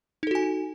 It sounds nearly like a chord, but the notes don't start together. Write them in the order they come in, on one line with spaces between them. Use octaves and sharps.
D#4 A4 F#4 G#5